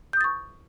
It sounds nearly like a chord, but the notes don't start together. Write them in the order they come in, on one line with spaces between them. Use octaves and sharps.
G6 D#6 A6 C#6